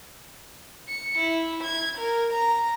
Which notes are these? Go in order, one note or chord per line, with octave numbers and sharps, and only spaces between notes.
C#7
E4
G#6
A#4
A#5